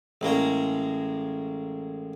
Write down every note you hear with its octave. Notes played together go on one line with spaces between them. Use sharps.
A1 G#3 A#3 A#5